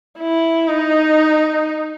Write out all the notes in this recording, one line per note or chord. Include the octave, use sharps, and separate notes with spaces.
E4
D#4